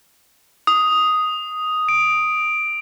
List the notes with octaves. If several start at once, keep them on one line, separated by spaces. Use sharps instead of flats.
D#6
D7